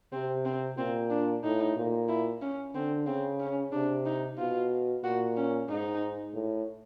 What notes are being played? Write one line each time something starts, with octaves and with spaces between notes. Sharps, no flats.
C3 C4
C4
A#2 C4
D4
A2 D#4
A#2
E4
C#4
D3 C4
C#3 C4
C#4
C3 D4
D#4
B2 F4
A#2 F#4
C#4
G#2 D#4
A2